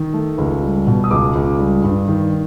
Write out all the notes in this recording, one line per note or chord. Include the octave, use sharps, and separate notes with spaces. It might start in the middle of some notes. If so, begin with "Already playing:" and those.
Already playing: D#3
A3
C#2
G3
B2
D#6
C#2 D6
C#2
G3
G2
D#3